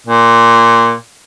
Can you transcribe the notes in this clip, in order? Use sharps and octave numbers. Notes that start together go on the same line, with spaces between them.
A#2